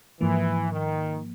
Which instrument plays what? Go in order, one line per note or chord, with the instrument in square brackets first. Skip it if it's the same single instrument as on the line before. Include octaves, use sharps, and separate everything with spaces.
[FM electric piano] G#2 F3 A#3 [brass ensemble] E3
[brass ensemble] D#3